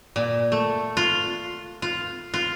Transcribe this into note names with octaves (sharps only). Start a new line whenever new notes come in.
A#2
A3
F4
F4
F4